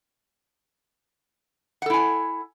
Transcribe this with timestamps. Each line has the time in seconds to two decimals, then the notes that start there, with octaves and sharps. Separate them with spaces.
1.82 F#5
1.86 A4
1.90 E4
1.94 G#5